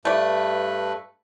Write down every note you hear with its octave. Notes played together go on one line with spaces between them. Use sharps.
G2 A3 B4 D5